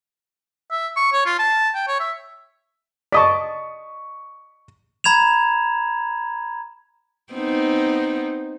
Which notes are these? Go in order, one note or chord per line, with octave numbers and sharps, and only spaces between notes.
E5
C#6
C#5
F4
A5
G5
C#5
E5
D5 D#5 A5 C#6 D#6 B6
A#5 B5 G#6 E7 F7
B3 C4 D#4